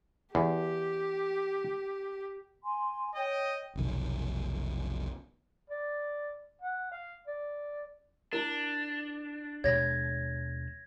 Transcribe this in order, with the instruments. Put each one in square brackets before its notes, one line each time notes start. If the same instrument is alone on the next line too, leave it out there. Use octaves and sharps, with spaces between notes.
[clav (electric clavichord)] E2 [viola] G4
[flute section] G#5 C6
[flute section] C#5 [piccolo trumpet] D#5 [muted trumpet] G5
[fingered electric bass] F1 B1 D#3
[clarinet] D5
F#5
F5
D5
[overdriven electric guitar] D4 [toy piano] E4 A#4
[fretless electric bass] D#2 B2 G#3 [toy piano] C#5 [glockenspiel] G#6 A#6